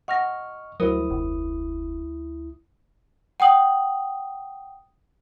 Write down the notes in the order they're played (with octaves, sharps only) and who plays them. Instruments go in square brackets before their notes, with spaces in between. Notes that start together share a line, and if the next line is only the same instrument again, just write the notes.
[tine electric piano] D#5 C#6 F6 [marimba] F#5 A#6
[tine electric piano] D2 E4 D#6 [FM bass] F#3 [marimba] A#4 C5
[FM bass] F1
[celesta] F#5 G5 D#6 F#7